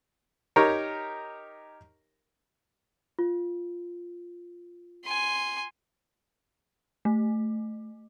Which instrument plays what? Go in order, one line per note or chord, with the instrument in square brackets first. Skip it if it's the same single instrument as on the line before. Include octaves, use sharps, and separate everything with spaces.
[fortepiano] D#4 G4 A#4 C#5
[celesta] F4
[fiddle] G#5 C6
[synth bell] A3